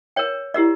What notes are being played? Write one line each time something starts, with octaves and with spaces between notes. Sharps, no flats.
A#4 C#5 G5
E4 G4 A#4 D5